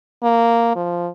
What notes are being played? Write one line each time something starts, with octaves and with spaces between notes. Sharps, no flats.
A#3
F3